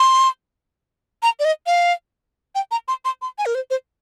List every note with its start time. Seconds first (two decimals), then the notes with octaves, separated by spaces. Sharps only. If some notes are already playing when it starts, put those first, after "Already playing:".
Already playing: C6
1.23 A#5
1.39 D5
1.45 D#5
1.66 F5
2.55 G5
2.71 A#5
2.88 C6
3.05 C6
3.22 C6
3.38 G#5
3.46 A#4
3.55 C5
3.70 C5